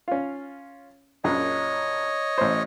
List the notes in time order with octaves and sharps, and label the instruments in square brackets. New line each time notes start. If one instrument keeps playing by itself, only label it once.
[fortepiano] C#4 F4
[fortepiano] A#1 F#2 [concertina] C#5 D#5
[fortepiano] A1 C5